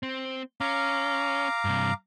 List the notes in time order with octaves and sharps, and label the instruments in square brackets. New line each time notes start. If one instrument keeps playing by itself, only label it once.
[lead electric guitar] C4
[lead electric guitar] C#4 [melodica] F5 A#5 D6
[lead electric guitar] G2 C3